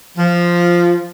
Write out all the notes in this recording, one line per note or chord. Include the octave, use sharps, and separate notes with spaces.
F3